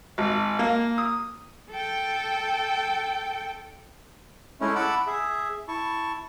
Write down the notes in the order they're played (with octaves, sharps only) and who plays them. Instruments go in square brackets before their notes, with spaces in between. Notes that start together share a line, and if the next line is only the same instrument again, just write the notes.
[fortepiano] G#1
A#3
D#6
[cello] A4 G5
[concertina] G#3 A3 C#4 E4
E4 F#5 A5 B5 D6 E6
G#4 E5
E4 A5 C#6